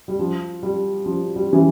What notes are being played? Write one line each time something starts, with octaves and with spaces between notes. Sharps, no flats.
G3
F3
G3
F3
G3
E3